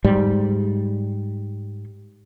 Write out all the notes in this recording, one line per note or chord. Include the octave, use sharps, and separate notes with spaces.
G#2 G3